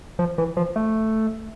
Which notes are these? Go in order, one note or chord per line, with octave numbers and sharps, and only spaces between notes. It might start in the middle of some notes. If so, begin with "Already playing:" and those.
F3
E3
F3
A3